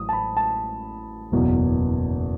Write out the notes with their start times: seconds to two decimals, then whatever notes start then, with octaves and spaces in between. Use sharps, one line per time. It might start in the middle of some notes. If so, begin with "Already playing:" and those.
Already playing: A1 A2 F#3 D#6
0.09 A5
0.13 B5
0.37 A5
1.32 F#1 E2 B2 F#3